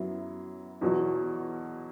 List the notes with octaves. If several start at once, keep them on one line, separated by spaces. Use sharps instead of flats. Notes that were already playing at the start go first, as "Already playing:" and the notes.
Already playing: F#2 F#3 B3 E4
E2 B2 F#3